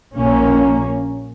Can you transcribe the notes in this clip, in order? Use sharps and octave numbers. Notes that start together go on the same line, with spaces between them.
A#1 A#2 A#3 C#4